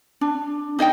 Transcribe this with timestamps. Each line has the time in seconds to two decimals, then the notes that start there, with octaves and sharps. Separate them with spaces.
0.21 D4
0.79 D#4 D#5 F5 G5